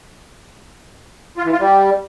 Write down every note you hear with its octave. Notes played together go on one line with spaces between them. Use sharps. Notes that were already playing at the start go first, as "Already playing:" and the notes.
F4
E3
F4
G3